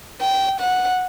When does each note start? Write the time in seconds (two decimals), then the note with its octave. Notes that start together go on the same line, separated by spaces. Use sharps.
0.21 G5
0.60 F#5